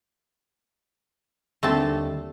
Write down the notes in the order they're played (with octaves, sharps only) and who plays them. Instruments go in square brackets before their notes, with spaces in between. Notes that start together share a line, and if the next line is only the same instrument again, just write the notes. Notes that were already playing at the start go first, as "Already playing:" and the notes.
[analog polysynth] D#2 D3 G3 [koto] A3 C4 A5